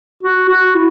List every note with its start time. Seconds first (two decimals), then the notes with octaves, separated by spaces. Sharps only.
0.23 F#4
0.49 F#4
0.75 E4